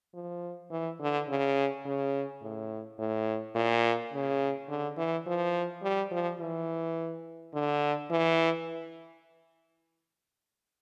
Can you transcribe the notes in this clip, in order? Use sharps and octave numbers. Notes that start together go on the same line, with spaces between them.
F3
E3
D3
C#3
C#3
A2
A2
A#2
C#3
D3
E3
F3
G3
F3
E3
D3
E3